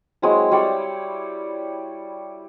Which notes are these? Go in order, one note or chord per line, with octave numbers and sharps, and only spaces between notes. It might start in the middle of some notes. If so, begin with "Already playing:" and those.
F#3 G#3 C4 E4
G3 C#5 D5 G5